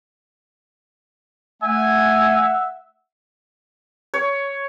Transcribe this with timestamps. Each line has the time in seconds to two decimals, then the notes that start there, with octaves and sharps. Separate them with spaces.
1.63 A3 E5 F#5 G#5
4.14 C#5